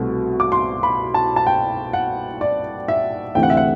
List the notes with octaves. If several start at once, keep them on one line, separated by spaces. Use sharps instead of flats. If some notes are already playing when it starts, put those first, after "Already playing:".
Already playing: C2 B2 A3 C4
D6
C6
B5
A5
A5
G5
F#5
D5
E5
D2 C3 E3 A3 C4 G5
F#5
E5
F#5